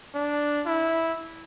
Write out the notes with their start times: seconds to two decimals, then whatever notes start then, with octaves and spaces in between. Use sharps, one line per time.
0.15 D4
0.67 E4